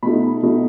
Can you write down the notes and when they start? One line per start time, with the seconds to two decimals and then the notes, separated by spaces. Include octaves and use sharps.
0.03 B2 A3 D#4 B5
0.43 B2 A3 D#4